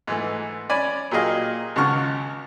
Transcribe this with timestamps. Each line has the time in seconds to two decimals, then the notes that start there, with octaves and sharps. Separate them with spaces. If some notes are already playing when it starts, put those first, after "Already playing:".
0.07 G#2 E3 A3
0.69 C#4 D5 G#5 B5
1.11 A#2 F#3 G4 G#4 D#5 F5
1.76 G#1 C#2 C#3 F#5 C#6 F6